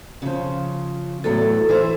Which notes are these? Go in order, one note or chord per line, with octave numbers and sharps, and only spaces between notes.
C#3 F3
E2 A2 F#3 A4
E3 E4 C5